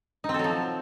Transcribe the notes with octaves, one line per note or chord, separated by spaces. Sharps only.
D#4
C4
A4
F#3
F3